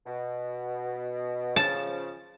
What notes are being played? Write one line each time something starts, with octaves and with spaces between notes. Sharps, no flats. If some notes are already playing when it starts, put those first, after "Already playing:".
B2
C#3 F3 A5